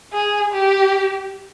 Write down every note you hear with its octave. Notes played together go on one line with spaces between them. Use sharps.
G#4
G4